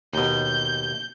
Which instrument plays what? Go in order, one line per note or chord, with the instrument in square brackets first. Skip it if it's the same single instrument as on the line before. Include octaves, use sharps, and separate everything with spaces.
[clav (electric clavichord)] D#2 B2 [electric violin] G6